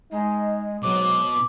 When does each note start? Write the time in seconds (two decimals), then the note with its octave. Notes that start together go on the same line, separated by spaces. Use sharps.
0.12 G#3 D#4
0.83 G#2 B2 F#3 D6